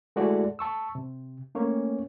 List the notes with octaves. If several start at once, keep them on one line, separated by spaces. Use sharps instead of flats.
G#3 A3 E4 F#4 A4 D5
A5 C#6 E6
C3
A3 A#3 C#4 C#5